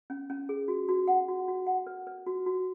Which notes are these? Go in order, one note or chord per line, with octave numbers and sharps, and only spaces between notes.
C#4
C#4
G#4
F#4
F#4
F#5
F#4
F#4
F#5
B4
B4
F#4
F#4